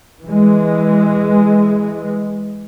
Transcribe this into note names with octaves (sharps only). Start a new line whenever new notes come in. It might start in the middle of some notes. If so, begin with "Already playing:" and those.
E3 G#3